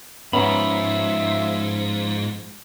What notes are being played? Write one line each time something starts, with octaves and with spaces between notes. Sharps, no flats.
G#2 F3 B3 C#4 E5 A#5 B5